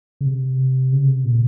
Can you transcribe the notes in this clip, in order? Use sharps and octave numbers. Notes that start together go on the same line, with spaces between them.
C#3
C3
C#3
C3
A#2